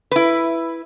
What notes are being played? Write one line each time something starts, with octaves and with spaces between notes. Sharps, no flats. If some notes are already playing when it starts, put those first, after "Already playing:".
E4 B4